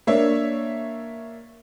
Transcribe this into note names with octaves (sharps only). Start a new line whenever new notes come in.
A#3 D4 C#5 E5